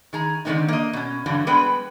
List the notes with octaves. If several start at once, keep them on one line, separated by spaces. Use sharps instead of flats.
D#3 G#4 A#5
D3 D#3 G#3 B3 C4 D#4
A#3 D#5
B2 C#4
G2 D3 E3 F#3 G3
G3 G#3 B3 B4 G5